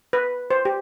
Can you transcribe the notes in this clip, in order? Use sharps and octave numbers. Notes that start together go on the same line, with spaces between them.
B4
C5
G4